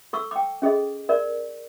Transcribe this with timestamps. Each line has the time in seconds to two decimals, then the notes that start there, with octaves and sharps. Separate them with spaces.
0.13 A4 C#6 E6
0.31 G5 D6
0.62 C#4 G#4 A4 D#5
1.09 A#4 D5